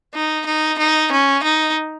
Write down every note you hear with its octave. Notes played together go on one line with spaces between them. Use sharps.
D#4
D#4
D#4
C#4
D#4